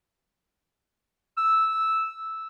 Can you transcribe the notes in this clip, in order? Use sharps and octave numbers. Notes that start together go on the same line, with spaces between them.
E6